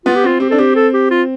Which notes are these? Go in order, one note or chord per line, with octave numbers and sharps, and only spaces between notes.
B3 F4
G4
C4 F4
C4 G4
D4 A4
C4 G4
A4
G4
F4